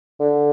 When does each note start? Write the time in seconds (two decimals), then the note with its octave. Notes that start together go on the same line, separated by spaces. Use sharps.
0.20 D3